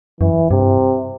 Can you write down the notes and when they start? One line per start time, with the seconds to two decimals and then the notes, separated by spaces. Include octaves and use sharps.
0.21 F#2 E3
0.51 G2 C3